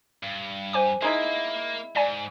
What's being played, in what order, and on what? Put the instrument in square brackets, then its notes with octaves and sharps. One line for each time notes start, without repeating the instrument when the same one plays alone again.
[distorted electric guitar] G2
[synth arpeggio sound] C5 G#5 D6
[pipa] G#3 D#4 E4 [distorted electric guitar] A#3
[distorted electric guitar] G#2 [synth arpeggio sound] D5 G#5